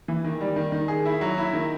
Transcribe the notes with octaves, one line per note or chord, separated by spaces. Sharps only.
E3
D#3
G3
D#3
D#3
G#4
E4
F#3
E4
D#3